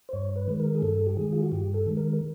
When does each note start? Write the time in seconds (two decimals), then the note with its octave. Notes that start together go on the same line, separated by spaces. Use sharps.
0.09 C5
0.13 G2 C#5
0.36 B4
0.48 D#3 G#3
0.60 A#4
0.75 G#4
0.82 G2 A4
1.07 G4
1.17 D#3 G#3 G#4
1.33 F4
1.42 F#4
1.52 G2 G4
1.74 A4
1.86 D#3 G#3
1.97 A#4